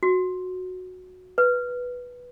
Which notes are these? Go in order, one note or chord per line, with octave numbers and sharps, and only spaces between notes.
F#4
B4